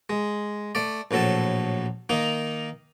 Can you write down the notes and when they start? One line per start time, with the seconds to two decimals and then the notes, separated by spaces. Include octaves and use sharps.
0.10 G#3
0.75 A3 D5
1.11 A#1 A2 F#3 A4 A5
2.09 D#3 A#3 D#4